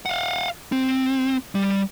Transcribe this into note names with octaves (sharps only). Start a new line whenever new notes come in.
F5 F#5
C4
G3